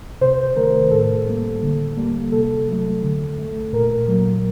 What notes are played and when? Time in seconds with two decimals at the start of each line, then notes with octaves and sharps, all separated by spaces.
0.21 C3 C5
0.56 D#3 A3 A#4
0.91 A2 A4
1.27 G3 A#3
1.62 D3
1.97 G3 A#3
2.32 C3 A4
2.68 F#3 A3
3.02 D3
3.38 A3
3.73 A#2 A#4
4.08 F#3 A#3